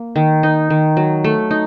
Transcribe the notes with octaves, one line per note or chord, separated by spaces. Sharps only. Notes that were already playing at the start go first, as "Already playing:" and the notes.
Already playing: A#3
D#3
D#4
D#3
F#3
A3
D#4